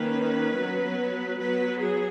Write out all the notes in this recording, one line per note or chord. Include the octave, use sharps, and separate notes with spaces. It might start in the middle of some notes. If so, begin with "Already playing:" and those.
Already playing: D#3 A#3 C#4 B4
F#3 B3
F#3 B3 B4
G#4